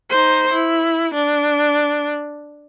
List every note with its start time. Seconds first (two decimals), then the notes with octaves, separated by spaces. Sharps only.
0.10 D#4 C5
0.53 E4
1.14 D4